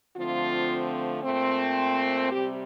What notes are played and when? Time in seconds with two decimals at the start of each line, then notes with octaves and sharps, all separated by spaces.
0.17 D3 F3 A3 C4 F4
1.24 A#2 A3 C4
2.31 C3 G3 C4 G4